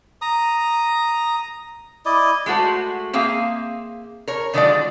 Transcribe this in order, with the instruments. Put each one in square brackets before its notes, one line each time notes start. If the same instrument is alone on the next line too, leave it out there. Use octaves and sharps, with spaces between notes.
[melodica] A#5 D#6
E4 D5 D#5
[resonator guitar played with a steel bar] G#3 A3 F#4 C5
A#3 C4 G#4 E5 F5
A#4 C#5
D3 D#3 F#3 G#3 F4 D5